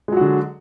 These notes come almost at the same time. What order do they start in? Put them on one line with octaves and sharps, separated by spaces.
G#3 F#3 F#4 D3